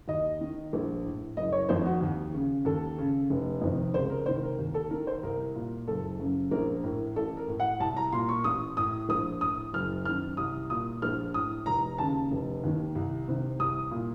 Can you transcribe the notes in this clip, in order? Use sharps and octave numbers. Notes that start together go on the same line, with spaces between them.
D#2 D#5
D#3
A#1
A2
F#1 D#5
C#5
F2 D#3 C5
F#4
D#2
C#3
D#2 A4
C#3
F1
F2 C3 D#3
C#2 C5
A#4
C3 D#3 C5
A#4
D#2
A4
D#3 A#4
C5
C2 A#4
A#2
F#1 A4
F#2 C#3
A#1 A#4
A2 A#4
A1 A4
A#4
A2
F#5
C2 A5
A#5
A#2 C6
C#6
A1 D#6
A2 D#6
A#1 D#6
A2 D#6
F#1 F6
F#2 D#3 F6
C2 D#6
A#2 D#6
A#1 F6
A2 D#6
F1 A#5
D#2 C#3 A5
F1
D#2 D#3
C2
C3 D#3
C2 D#6
A#2